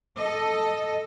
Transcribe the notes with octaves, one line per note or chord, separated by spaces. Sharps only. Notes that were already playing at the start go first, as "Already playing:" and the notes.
A4 D#5